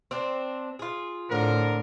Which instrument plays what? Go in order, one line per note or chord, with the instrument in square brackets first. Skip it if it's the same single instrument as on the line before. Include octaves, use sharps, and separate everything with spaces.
[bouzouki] C4 D4
F4 G#4
[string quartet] A2 [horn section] D3 C4 A#4